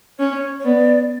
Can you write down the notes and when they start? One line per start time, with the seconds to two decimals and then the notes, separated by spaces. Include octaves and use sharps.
0.19 C#4 C#5
0.59 C#5
0.64 B3 D5